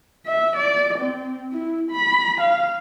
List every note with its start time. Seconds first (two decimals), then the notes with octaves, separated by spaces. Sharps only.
0.26 E5
0.57 D5
0.98 C4
1.51 E4
1.91 B5
2.40 F5